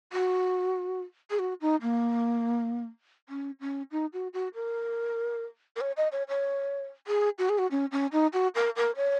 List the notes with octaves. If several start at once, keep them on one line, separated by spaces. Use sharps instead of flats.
F#4
G#4
F#4
D#4
A#3
C#4
C#4
D#4
F#4
F#4
A#4
A#4
C#5
D#5
C#5
C#5
G#4
F#4
G#4
F#4
C#4
C#4
D#4
F#4
A#4
A#4
C#5